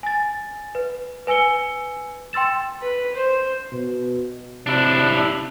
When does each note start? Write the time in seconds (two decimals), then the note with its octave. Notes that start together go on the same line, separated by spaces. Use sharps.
0.03 G#5 A6
0.75 B4
1.27 B4 G#5 E6 C#7 G7
2.33 G5 C6 E6 A6 E7
2.82 B4
3.15 C5
3.72 B2
4.67 C3 D4 E4